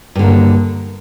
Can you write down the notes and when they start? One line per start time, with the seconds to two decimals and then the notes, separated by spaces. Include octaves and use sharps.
0.15 G2
0.19 D3
0.23 A#3